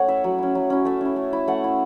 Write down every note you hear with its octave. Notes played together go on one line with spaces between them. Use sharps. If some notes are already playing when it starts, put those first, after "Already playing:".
Already playing: A3 C#4 C#5 F#5
E4 E5
F#3
C#4 E4
F#3
C#4 E4
A3 E5
C#4 E4
A3
E4
A3 F#5
E4